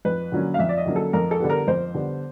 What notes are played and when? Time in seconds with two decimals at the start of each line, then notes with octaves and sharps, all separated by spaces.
0.05 F2 B4
0.32 D3 F#3 A#3 C#4
0.54 F5
0.59 F2 E5
0.69 D5
0.78 D#5
0.86 D3 F#3 A#3 C#4
0.96 A4
1.13 F2 A#4
1.31 A4
1.40 D3 G3 B3
1.50 A#4
1.67 F2 C5
1.94 D3 G3 B3